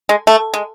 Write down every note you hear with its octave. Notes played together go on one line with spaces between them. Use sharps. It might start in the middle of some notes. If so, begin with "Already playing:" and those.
G#3
A3
G#3